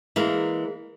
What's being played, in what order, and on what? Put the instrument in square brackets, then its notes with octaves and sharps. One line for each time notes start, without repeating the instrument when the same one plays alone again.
[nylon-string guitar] E3 G#3 A#3 A#4